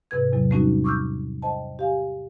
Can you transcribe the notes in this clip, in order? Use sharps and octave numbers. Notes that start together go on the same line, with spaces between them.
G#2 C3 B4 G#6
E2 C3 F#3
G3 A3 C4 C#4 D#4 F#4
C#6 D6 E6 F6 G6
C5 D#5 G5 A5
G4 F5 G#5